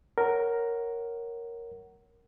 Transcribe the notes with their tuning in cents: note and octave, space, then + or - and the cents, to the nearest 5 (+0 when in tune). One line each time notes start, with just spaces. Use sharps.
A#4 +0 C#5 +0 F#5 +15